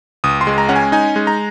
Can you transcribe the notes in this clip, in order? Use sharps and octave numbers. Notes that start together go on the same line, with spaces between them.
C#2 D#6
C6
G#3
A#5
C#4 F#5
G#5
D#4 G#5
G#3
A#5